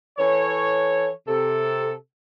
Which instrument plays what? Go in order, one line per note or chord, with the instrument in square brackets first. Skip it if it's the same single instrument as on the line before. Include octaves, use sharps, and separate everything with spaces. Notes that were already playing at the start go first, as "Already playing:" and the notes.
[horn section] E3 A4 C#5
C3 A4